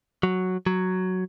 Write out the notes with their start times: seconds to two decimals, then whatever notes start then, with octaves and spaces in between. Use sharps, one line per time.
0.23 F#3
0.66 F#3